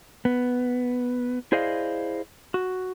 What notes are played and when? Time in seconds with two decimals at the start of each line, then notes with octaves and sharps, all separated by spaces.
0.25 B3
1.52 E4 G#4 C5 D5 D#5 F5
2.54 F#4